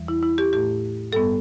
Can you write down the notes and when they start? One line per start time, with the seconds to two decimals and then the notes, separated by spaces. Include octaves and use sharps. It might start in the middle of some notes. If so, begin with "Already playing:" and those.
Already playing: E2 E3 G3
0.08 E4
0.23 E4
0.38 G4
0.53 A2 A3 G4
1.12 G2 G3 B3 A4